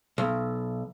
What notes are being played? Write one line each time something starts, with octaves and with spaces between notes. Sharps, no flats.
B1